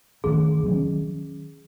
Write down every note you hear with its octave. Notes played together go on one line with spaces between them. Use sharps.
D#3 F#3 A3 C#4 G#4
D#3 F#3 A3 C#4